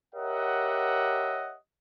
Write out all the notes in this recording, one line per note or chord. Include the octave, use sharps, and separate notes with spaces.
G4 A#4 C#5 D#5 E5 F#5